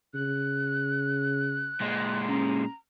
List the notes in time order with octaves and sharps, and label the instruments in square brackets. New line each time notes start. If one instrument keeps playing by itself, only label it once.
[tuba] C#3 [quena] F#6
[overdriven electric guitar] A#2 G#3
[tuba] C#4 [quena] A#5